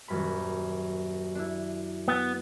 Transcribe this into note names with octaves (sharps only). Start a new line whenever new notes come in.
D#1 F#2 B5
D4 E4
B3